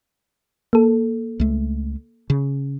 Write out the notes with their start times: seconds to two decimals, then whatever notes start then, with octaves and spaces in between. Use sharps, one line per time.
0.73 A#3 A4
1.40 C#2 A3
2.30 C#3